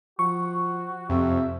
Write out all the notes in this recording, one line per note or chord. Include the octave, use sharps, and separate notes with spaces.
F3 F#4 C#6
F2 C3 E5